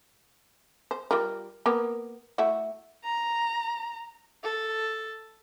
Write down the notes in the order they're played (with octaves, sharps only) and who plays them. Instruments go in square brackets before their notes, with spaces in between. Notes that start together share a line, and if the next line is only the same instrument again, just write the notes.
[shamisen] C5
G3 F4 A#4
A#3 B3 A#4
A3 E4 F#4
[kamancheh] A#5
A4